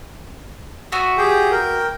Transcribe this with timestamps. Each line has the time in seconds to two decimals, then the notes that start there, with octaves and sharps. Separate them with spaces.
0.92 B3 F#4 E5
1.18 G4 G#4 G5
1.51 A#4 G5